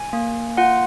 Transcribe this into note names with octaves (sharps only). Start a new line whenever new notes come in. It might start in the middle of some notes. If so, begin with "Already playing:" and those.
Already playing: G#5
A#3
F4 F#5